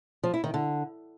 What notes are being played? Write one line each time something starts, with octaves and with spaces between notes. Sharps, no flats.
F3
E4
D#3
D3